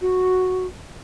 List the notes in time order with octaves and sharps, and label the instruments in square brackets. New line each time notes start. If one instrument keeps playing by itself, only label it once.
[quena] F#4